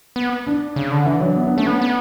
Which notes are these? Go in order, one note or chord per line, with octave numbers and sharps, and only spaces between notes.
B3
D4
C#3
D3
E3 D4
F#3 D4
B3
B3
A3 C#4
B3 D4
B3